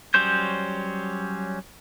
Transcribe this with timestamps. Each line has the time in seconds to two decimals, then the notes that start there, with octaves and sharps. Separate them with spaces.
0.14 F#3 G3 C#4 C5 G6